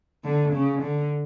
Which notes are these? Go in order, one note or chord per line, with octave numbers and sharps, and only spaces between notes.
D3
C#3
D3